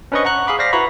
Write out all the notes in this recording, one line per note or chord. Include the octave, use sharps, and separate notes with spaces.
C#4 D4 B4 C5 D#5 C#6
F#5 A#5 C#6 F#6
G#4 F5 B5 D6
C5 D5 F5 A#6 B6
E4 F#4 B4 A#5 B5 C#6